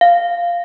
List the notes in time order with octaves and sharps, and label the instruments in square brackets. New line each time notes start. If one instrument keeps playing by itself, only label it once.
[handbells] F5